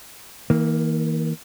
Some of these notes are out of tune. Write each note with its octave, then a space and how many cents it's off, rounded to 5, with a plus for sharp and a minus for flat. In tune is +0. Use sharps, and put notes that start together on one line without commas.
E3 -45 A#3 +0